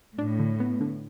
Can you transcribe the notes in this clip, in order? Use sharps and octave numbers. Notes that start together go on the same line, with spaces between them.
A2 D4
D3
B3
D3